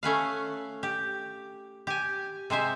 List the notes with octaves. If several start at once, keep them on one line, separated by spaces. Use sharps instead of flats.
A3 C#4 B4 F5
G4
G4 G#5
C3 G#3 C5 E5